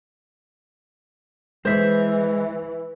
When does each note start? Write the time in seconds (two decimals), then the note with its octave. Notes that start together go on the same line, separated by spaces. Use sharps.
1.65 E3 G#3 C5 E5